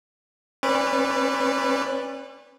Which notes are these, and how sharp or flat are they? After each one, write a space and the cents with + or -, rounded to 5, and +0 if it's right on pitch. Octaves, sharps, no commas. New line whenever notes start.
C#4 -40 B4 +0 D5 -10